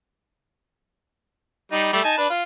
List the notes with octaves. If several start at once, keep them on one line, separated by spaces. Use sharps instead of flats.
G3 D#4
G3 A3
D#4 G#5 A5
D4 B4
F4